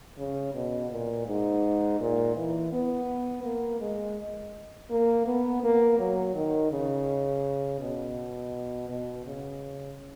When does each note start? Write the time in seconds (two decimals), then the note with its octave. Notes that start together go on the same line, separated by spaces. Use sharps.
0.18 C#3
0.54 B2
0.91 A#2
1.26 G#2
2.00 A#2
2.36 E3
2.72 B3
3.44 A#3
3.81 G#3
4.90 A#3
5.26 B3
5.63 A#3
5.99 F#3
6.35 D#3
6.71 C#3
7.80 B2
8.89 B2
9.25 C#3